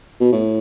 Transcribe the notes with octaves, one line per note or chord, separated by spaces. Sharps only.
B2
A2